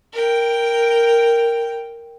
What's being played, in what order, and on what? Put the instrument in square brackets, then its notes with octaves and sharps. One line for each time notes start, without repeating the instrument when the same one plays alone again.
[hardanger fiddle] A#4 G5